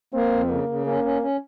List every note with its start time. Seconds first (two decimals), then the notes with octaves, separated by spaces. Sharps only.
0.13 A#3 C4
0.32 F2
0.50 C#3 A#3
0.68 C#3
0.86 A#3 C#4
1.04 C#4
1.22 C#4